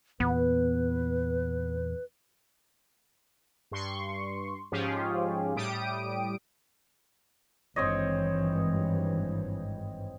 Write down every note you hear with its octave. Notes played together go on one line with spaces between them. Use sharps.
E2 A#2 B3 B4
G2 C6 C#6
G#2 F3 C#4 F4 G4 G#4
A2 G3 G4 D#6 D7
G#1 G2 E3 C4 C#5 D#5